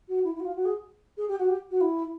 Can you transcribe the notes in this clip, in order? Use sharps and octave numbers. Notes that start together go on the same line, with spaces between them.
F#4
E4
E4
F#4
F4
F#4
G#4
G#4
G4
F#4
G4
F#4
E4